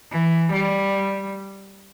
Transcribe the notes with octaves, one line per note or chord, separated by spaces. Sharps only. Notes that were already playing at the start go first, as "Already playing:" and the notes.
E3
G3